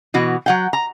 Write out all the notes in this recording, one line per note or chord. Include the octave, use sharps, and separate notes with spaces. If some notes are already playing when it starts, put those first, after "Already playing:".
B2 E3 F#4
F#3 F#5 G5
A#5